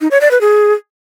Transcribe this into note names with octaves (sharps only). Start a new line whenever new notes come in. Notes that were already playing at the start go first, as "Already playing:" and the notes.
D#4
C#5
D5
B4
G#4